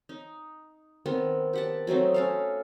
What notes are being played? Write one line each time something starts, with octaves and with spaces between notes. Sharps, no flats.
D#4
D#3 B3 C4
G4 F#5 A5
F#3 A3 C4 D#4
C#4 A4 F5